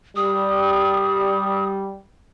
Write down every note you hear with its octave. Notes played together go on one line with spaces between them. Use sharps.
G3 D#6